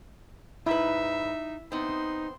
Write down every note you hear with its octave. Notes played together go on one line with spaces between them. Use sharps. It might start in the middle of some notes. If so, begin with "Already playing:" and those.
G#2 D#4 E4 B4 E5
B3 C4 D#4 C6